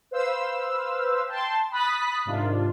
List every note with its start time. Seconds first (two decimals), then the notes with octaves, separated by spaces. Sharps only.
0.11 B4 C5 F5 E6
1.27 G5 A5 C6
1.71 B5 D#6 F#6 A6 B6
2.25 G#2 C3 D#3 D4 F4